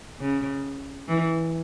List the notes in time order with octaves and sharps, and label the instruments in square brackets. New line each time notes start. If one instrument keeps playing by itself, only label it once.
[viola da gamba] C#3
E3